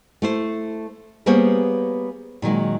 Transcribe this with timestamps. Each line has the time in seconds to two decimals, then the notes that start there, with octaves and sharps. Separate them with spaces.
0.22 A3 E4 C5
1.26 G3 A#3 B3 G#4 C5 C#5
2.42 A#2 D#3 F#3 G#3